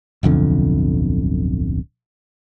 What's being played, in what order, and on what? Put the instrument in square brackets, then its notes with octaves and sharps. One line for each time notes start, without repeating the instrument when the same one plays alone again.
[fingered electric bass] D1 B1 F2 D3